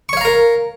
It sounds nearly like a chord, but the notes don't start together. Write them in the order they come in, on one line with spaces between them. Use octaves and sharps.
C#6 C#5 F5 A#5 A#4